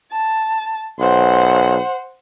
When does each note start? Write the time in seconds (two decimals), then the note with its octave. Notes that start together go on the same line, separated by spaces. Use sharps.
0.12 A5
0.99 B1 C5 F#5